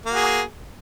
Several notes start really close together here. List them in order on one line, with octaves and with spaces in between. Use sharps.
A#3 F#4 G#4